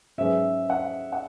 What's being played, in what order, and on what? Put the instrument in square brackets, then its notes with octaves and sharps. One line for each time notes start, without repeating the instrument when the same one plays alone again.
[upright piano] G#2 F#3 C#4 G#4 B4 [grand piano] E5
[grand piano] F#5
F#5